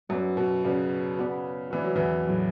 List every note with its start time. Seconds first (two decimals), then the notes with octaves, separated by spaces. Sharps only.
0.09 F#2 F#3 B3 F#4 B4 D5
0.37 B2
0.64 C#3 B3 F#4 B4 D5
1.19 B3 F#4 B4 D5
1.70 E3 B3 F#4 B4 D5
1.84 F#3
1.96 E2 E3
2.27 A2 F#3 B3